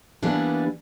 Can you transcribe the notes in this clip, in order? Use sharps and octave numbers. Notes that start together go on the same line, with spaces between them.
E3 G3 A#3 B3 D4 E4